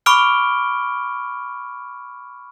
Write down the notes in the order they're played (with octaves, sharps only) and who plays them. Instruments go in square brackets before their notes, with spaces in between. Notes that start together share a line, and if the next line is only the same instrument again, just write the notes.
[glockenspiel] B5 C#6 D6 F6 D7 G7